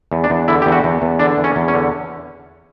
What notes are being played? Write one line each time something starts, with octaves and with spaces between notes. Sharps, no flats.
E2
D4
E2
D3 E4
E2 G4
F#4
E2
E2
D3 D4
E2
C#4
E2
C#4
D3